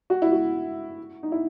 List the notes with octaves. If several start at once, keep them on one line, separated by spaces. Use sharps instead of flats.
F#4
E4
F#4
D#4
E4